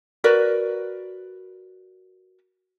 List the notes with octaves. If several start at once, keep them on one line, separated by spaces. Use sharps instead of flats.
F#4 A#4 B4 D5